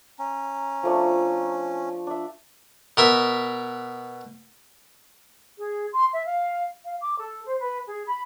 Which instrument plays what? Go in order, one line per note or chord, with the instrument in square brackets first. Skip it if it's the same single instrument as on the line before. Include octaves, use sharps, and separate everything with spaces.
[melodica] C#4 [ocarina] A#5
[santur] F3 A3 D4
D4 E5
[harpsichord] B2 A#4 E5
[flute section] G#4
C6
E5
F5
F5
D6
A4
C5
B4
G#4
B5